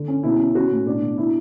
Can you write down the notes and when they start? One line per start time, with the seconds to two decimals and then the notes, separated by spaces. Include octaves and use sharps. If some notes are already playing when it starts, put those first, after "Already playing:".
Already playing: D3
0.08 C#4
0.23 B2 E4
0.39 C#4
0.55 C#4 F#4
0.71 A2
0.86 B2 D4
1.02 B2
1.17 D4 E4